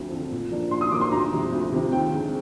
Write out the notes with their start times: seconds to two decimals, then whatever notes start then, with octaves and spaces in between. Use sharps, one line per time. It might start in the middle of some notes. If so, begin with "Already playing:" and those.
Already playing: D2 D3 F3 C4
0.11 D3 F3 C4
0.31 A#2
0.51 F3 A#3 D4
0.71 A#2 C6
0.81 D#6
0.91 F3 A#3 D4 D6
1.01 C6
1.12 D2 A#5
1.32 C3 F3
1.52 D2
1.72 C3 F3
1.92 D#2 G5
2.13 D3 G#3 C4